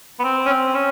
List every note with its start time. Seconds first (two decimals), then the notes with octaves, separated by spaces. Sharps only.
0.20 B3
0.24 C4
0.46 C#4
0.49 C4
0.75 C#4